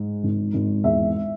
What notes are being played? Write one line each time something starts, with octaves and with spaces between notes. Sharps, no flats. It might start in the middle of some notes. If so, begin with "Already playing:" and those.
Already playing: G#2
G#1
G#1
E2 E5